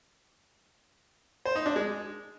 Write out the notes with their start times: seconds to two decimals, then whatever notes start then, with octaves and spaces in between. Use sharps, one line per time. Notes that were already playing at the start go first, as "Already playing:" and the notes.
1.45 C5
1.56 D#4
1.66 D4
1.76 G#3